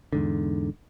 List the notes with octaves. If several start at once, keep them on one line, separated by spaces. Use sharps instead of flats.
E2 G#2 D3